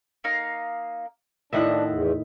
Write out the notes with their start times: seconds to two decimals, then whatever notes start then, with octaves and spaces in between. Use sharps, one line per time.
0.24 A#3 D#4 F5
1.53 A2 D#3 C4 D4 E5 F#5 F#6
1.89 E2